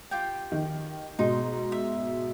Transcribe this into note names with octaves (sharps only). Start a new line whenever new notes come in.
F4 G4 G5
D#3
G#2 B2 D#4 C6
E5